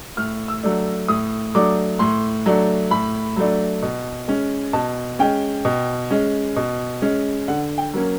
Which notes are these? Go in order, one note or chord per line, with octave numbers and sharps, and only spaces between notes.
A2 F6
E6
F#3 A3 D4
A2 D#6
F#3 A3 D4 D6
A2 C6
F#3 A3 D4
A2 B5
F#3 A3 D4
B2
G#3 C#4
B2 A5
G#3 C#4 G5
B2
G#3 C#4
B2
G#3 C#4
D3 F#5
G5
F#3 A#3 C#4